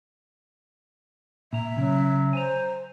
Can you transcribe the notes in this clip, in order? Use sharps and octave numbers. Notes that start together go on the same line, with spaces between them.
A#2 E5 A#5
C#3 F#3 C#4
C5 G#5 A#5